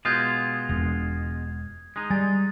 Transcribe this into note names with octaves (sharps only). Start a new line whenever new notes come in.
B2 G#3 F4 D#6 G6 G#6
E1
G#3 D#4
G3 G#5 A6